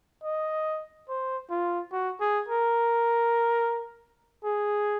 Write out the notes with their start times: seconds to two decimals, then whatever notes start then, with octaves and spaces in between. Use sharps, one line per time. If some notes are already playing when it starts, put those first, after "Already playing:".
0.24 D#5
1.09 C5
1.50 F4
1.93 F#4
2.20 G#4
2.48 A#4
4.44 G#4